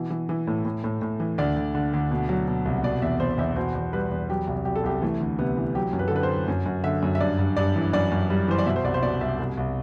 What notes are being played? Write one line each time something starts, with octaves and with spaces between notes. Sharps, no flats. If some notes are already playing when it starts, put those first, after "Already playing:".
Already playing: B2 E3
E3
E3
A2
A2
A2
A2
E3
D2 D5
D2
D3
D2
B2
F#3
B2
C2
B2 D5
E2 E5
E2 C5
E2 E5
B2 C5
E2
G3 B4
E2
F#3 G4
C2
F#3 G4
A4
C2 G4
E3 A3
D2
C3 B3
E3
F#3 G4
F#2
B4
A4
D3 B4
C5
F#3
F#2
F#2
D3 E5
F#2
E5
G2 D5
G2
G2 D5
E3
F#2 D5
F#2
G3
E3 C5
D5
B2 E5
C5
C2 D5
C5
B2 D5
C2 E5
C2
C2